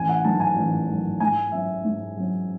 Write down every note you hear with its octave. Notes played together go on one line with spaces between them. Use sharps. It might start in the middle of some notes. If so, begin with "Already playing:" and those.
Already playing: A1 G#5
F#5
G#2 D#3 F#3 A5
G#5
A1
G#2 D#3 F#3
G#2 G#5
F#3 C#4 E5
G#2
F#3 C#4